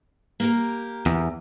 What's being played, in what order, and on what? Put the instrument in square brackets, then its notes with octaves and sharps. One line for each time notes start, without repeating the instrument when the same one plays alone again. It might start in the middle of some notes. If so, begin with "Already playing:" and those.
[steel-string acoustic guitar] A#3 G4 A#4
[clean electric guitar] E2